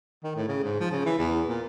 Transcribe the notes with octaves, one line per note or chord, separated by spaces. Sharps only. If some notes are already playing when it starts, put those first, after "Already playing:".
D#3
A2
C#3
G#2
F3
C#3
E3
E2
A#2